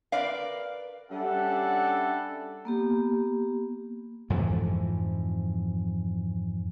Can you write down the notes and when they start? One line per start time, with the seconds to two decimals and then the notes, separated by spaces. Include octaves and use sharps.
0.12 A#4 B4 D5 F5
1.11 G3 C#4 D4 A4 E5 F#5
2.65 A#3 B3 G4
4.30 F2 G#2 E3 F3